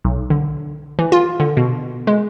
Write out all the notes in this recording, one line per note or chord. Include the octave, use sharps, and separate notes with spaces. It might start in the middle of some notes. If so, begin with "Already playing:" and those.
B1
D3
E3
F4
D3
B2
G#3